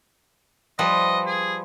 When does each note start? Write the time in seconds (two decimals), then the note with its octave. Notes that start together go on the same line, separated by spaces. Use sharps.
0.79 F3 G3 B4 D#5
1.26 G#4